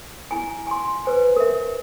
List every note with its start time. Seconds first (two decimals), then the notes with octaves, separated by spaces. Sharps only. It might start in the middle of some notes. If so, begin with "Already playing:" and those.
0.31 E4 G#5
0.67 G#5 C6
1.05 B4 C5 G#5
1.36 A#4 E5